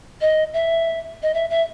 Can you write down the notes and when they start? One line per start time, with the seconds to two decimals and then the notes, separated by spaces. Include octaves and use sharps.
0.21 D#5
0.53 E5
1.22 D#5
1.34 E5
1.50 E5